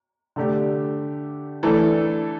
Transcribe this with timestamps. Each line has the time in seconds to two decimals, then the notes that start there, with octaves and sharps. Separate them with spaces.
0.36 D3 A3 D4 G4
1.63 E3 A3 D4 A4